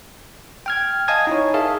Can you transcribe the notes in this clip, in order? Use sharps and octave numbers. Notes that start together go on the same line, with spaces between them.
G5 F6 G#6
D#5 F5 G#5 A5 D#6 G#6
D#4 E4 C#5
G#4 A#4 E5 F5 A5